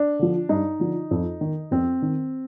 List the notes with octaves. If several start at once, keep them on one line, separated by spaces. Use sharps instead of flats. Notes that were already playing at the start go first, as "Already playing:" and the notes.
Already playing: D4
D3 F3
G2 D#4
D3 F3
F2
D#3
F2 C4
D#3